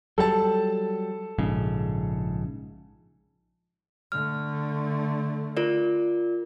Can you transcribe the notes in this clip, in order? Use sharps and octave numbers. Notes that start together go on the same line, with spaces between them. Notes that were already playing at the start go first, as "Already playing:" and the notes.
F#3 G3 A4 A5
A#1 G#2 C#3
D3 A3 F6
F4 A#4 D5